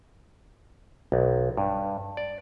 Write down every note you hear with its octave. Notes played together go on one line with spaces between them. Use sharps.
B1
G2
D5